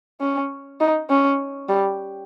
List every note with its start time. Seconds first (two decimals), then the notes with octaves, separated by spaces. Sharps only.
0.21 C#4
0.80 D#4
1.10 C#4
1.69 G3